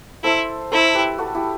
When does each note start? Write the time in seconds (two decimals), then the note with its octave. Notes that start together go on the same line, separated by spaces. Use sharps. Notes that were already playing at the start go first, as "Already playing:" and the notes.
0.24 E4 A4 C5
0.72 E4 A4 C5
0.95 G4 B4
1.18 F#4 A4
1.34 E4 G4